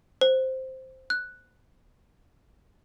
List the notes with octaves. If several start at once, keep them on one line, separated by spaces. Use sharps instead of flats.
C5
F#6